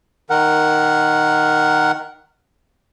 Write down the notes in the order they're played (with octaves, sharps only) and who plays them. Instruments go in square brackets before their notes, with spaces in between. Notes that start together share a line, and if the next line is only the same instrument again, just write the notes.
[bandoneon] D#3 A#4 F#5